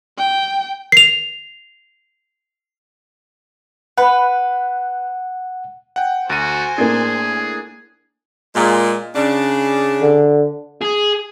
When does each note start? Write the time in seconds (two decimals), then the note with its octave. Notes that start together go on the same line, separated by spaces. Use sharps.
0.18 G5
0.92 C7 F7
3.98 B4 F#5
5.96 F#5 G5
6.30 D2 F#4 C5 G#5 D#7
6.78 A2 A#3 D4 G#4
8.55 A#2 G#3
9.15 C#3 D4
10.01 D3
10.82 G#4